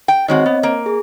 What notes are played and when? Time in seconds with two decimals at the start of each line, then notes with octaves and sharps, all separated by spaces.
0.08 G5
0.28 D#3 G#3 C4 F#4 C#5 D#5
0.46 B3
0.63 A#3
0.86 G#4